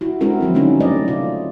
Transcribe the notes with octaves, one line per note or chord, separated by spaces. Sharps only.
E4 F#4
G#3 C4 D4 E4 F#4 A#4
F3 F#3 F#4
D3 F#3 G#3 A#3 C#4 D#4
A3 D4 C5 D5 D#5
C3 F4